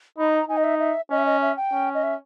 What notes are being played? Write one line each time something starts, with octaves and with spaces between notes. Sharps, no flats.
D#4 B5
A#5
D#4 G#5
D#5
E5
E5
C#4 D#5
E5
D#5
E5
G5
C#4
D#5
E5